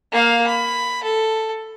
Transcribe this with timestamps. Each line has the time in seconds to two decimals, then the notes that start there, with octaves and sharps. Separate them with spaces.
0.12 A#3 F5
0.47 B5
1.04 A4